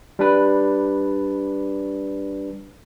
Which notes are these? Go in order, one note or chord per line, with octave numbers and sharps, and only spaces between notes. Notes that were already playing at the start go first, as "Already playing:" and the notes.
G3 D4 B4